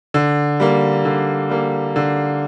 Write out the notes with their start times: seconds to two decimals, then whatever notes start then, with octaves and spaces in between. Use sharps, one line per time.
0.14 D3
0.60 G3 A#3
1.05 D3
1.50 G3 A#3
1.96 D3